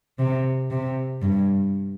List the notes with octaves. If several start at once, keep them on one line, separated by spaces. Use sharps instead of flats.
C3
C3
G2